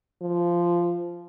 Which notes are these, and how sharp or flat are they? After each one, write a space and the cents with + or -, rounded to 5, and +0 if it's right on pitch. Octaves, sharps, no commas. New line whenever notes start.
F3 -10